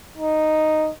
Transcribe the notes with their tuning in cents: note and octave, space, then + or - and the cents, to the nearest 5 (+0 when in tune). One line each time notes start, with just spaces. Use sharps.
D#4 -5